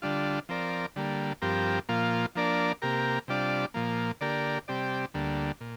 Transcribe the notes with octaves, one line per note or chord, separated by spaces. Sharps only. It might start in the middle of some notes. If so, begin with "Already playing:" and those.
D3 G3 D4 F4
F3 C4 A#4 D5
D3 G3 A#3
G2 F3 C4 G4 A#4
A#2 F3 A#3 F4
F3 A#3 D4 A#4 D5
C3 A#3 G4 A#4
C3 G3 D4 F4 D5
A#2 F3 A#3
D3 A#3 G4 A#4 D5
C3 G3 C4 G4 D5
D2 D3 G3 A#3
A#2